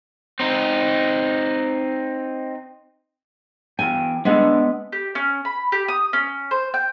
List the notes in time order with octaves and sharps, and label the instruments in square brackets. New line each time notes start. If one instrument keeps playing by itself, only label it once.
[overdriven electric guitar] C4 D#4
[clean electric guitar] E2 G5 [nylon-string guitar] G#5
[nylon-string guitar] G#3 B3 [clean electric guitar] D4 F#5
[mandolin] G4
C#4
B5
G4
D#6
C#4
C5
G5